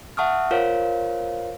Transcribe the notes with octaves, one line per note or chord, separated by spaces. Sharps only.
E5 F#5 A5 C#6 D#6 F6
F4 A#4 C5 C#5 F5